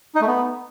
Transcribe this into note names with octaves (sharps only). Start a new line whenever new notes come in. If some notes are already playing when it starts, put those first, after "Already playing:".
D#4
A3
B3